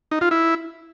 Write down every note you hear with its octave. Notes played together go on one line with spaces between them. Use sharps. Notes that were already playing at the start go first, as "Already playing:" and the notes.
D#4
F4
E4